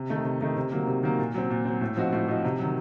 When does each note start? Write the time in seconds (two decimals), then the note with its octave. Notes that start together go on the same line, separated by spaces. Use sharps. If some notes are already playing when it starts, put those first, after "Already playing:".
Already playing: C3
0.09 D#3 A3 D#4
0.25 C3
0.41 D#3 A3 D#4
0.57 C3
0.72 D#3 F#3 A#3
0.87 C3
1.03 D#3 F#3 A#3
1.19 A#2
1.34 F#3 C4
1.50 A#2
1.65 F#3 C4
1.81 A2
1.96 F3 C4 D#4 F#4
2.13 A2
2.28 F3 C4 D#4 F#4
2.44 C3
2.59 D#3 F#3